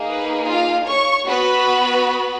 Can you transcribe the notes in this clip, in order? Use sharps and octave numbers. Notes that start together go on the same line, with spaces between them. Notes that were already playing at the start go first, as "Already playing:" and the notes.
Already playing: A#3 D#4 G#4
B4
F4 F5
C#5 C#6
B3 F#4 B4 B5